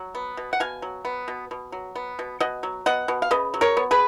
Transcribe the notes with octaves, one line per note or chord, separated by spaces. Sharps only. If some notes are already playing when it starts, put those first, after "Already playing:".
Already playing: F#3
B3
B2
F#5
B2 F5 G#5
F#3
B3
B2
B2
F#3
B3
B2
B2 D#5 F#5
F#3
B3 D#5 F#5
B2
F5
C#3 B4 D#5
F#3
A#4 C#5
B3
G#4 B4